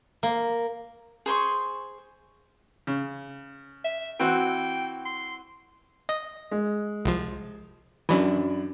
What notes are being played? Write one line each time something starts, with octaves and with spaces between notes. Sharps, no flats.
A#3
G#4 C5 C6 C#6
C#3
E5
E3 C4 F#4 G5
C6
D#5
G#3
C2 F3
F#2 E3 F#3 D4 B5